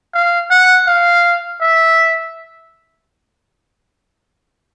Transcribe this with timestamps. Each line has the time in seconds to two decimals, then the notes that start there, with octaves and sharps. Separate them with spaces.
0.14 F5
0.51 F#5
0.87 F5
1.61 E5